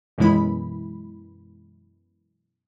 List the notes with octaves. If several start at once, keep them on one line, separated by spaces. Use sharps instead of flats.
F#2 B2 E3 G#3 E4 B5